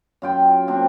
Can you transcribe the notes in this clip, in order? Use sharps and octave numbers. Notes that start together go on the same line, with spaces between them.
F#2 F4 G5
A#3 C4 D4